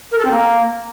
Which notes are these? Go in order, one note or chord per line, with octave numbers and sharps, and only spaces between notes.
A#4
A4
C4
A#3